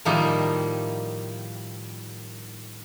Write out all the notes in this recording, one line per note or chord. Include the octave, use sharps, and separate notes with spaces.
A2 D#3 F3 G3 A#3 D#4